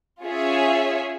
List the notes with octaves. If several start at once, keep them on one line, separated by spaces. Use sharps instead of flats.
C#4 F4 G#4 C#5 E5